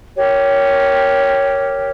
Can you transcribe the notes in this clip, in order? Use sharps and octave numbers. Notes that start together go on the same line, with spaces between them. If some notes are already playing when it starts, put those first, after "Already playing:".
G4 A#4 C#5